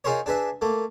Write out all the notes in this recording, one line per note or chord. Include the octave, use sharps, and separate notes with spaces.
D#4 F4 G#4 A#4 C5 C#5
D4 G#4 B4 E5
A3 A#3